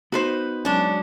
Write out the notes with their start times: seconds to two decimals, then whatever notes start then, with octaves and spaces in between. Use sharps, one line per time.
0.12 B3 D#4 F#4 B4 C5
0.65 F#3 G#3 C#4 D4